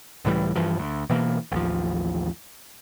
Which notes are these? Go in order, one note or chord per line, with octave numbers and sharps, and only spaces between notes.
C#2 A2 E3 G3
G2 E3 F3
D2
B2 E3 A#3
A1 D#2 F3